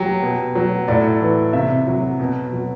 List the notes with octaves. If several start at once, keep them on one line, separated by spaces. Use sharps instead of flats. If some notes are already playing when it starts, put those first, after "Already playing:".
Already playing: F#3 G4
B2
F#3
A2 D5
E3
C3 E5
F#3
B2
F#3